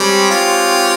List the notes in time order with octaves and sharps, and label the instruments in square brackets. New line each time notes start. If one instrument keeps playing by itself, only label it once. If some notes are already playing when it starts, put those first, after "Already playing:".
Already playing: [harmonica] G3 [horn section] G#3 C4 G4 C#5
[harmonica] F4